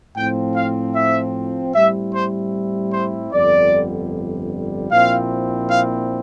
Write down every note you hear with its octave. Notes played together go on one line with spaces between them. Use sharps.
A2 F3 C4 G5
F5
E5
A2 G3 C4 E4 E5
C5
C5
G1 F2 D3 G3 D5
A#1 A#2 F3 C4 E4 F5
F5